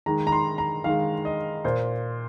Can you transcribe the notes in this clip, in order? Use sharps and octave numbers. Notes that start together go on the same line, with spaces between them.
D#3 G#3 A#5
A#5
C6
A#5
D#3 G#3 F5
D#5
A#2 A#3 C5